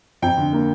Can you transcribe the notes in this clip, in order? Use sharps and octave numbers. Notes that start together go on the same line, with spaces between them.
F2 G5
D3
A#3